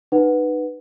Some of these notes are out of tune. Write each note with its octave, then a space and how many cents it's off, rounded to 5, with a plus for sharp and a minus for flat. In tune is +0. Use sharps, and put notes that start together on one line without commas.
D#4 -30 B4 +0 F#5 +0